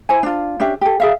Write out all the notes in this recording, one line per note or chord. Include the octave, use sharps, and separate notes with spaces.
E4 C5 G#5
D4 F4
C#4 D4 G4 E5
G4 A4
G#4 E5 F5